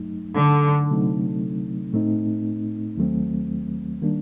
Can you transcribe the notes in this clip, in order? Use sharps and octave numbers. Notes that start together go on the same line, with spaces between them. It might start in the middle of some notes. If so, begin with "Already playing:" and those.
Already playing: G2 F#3 A3 D#4
D3
C3 F#3 A3 C4 D#4
A2 A3 C4 D#4
D#2 D#3 F#3 A3 C4
D#3 G3 A#3 D4